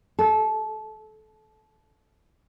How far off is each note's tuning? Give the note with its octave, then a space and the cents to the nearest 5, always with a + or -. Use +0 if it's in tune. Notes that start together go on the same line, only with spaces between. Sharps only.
A4 -25